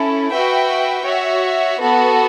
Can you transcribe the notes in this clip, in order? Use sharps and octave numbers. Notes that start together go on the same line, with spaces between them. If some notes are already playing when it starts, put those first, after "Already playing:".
Already playing: C#4 E4 A4
F#4 B4 E5 G5
F#4 C#5 E5
B3 F#4 A4